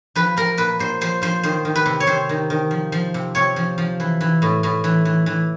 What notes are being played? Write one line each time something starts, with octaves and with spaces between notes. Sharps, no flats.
F3 B4
F3 A#4
A#2 B4
A#2 C5
F3 C5
F3 C5
D#3 C5
D#3
B4
C3
C#5
C3 C5
D#3
D#3
F3
F3
C3
C3 C#5
F3
F3
E3
E3
A2
A2
E3
E3
E3